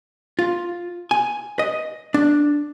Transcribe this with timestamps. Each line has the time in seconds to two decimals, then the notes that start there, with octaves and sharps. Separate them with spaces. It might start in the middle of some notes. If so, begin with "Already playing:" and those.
0.39 F4
1.11 G#5
1.59 D#5
2.14 D4